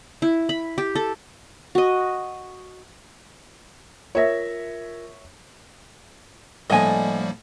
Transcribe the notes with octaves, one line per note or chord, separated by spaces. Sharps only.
E4
B5
G4
A4
F#4 D#5
F4 A#4 C#5 E5 A#6
A2 D3 F3 G3 A#3 D#5 G#5